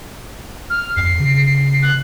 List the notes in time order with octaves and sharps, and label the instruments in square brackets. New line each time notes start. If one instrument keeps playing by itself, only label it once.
[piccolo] F6
[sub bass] F2 [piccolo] C7
[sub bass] C#3
[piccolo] C7
F#6